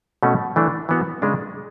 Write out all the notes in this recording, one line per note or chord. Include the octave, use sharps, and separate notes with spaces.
B2 A3 C#4
E3 A3 D4
E3 B3 F#4
C#3 G#3 D4